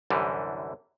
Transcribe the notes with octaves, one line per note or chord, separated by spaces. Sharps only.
C2 F#2 D3 E3 G3